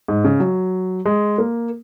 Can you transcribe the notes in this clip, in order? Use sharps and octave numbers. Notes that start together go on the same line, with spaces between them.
G#2
C#3
F#3
G#3
A#3